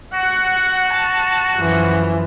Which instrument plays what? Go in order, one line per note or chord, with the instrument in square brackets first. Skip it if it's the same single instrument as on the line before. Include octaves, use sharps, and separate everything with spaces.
[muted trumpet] F#4 [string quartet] F#5
[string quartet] A5
F#2 E3 F3